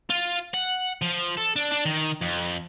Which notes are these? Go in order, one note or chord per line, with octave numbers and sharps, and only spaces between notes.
F4
F#5
F3
A4
D4
D4
D#3
F2